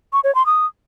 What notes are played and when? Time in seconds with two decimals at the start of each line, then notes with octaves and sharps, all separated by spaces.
0.13 C#6
0.24 C#5
0.35 C6
0.46 D#6